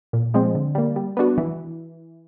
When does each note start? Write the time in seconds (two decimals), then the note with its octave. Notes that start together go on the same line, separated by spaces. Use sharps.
0.13 A#2
0.34 F3 G#3 C4
0.55 D3
0.75 G3 A#3
0.96 G3
1.17 B3 D4 F#4
1.38 E3